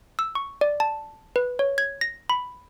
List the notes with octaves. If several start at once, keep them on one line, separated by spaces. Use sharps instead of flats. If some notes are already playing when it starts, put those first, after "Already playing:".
E6
C#6
D5
A5
B4
C#5
G#6
A#6
B5